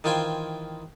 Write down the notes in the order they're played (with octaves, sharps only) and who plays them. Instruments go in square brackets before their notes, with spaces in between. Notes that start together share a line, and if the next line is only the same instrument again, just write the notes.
[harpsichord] D#3 E3 F4 C5 G5 G#5